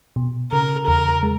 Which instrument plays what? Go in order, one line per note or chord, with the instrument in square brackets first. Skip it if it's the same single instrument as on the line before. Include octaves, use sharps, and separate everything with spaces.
[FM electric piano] B2
[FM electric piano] C#3 [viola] A#4
[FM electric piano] E2 [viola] A#4
[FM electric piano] G#3